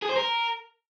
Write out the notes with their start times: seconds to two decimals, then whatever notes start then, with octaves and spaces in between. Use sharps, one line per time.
0.02 G#4
0.09 C5
0.16 A#4